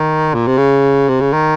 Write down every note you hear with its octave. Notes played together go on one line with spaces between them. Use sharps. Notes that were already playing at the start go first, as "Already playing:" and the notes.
Already playing: D#3
A#2
C3
C#3
C3
C#3
D#3